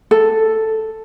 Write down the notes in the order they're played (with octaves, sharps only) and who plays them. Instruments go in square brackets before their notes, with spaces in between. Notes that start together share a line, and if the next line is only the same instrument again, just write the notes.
[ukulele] A4